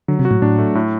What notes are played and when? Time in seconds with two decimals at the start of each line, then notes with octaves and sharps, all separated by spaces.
0.08 D3 F#3
0.19 C3
0.25 F#4
0.31 A2
0.42 A2 D4
0.59 A3
0.75 A2